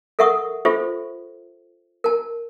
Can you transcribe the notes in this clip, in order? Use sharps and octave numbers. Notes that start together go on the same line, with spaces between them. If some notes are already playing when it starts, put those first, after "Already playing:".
A4 A#4 E5 F#5 C#6 D#6
F4 G4 A4 C5 E5
A#4 A5